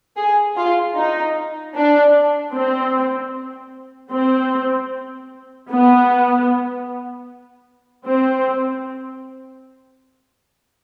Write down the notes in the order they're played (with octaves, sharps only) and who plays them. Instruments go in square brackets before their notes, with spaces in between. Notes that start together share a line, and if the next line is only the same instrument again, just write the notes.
[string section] G#4
F4
D#4
D4
C4
C4
B3
C4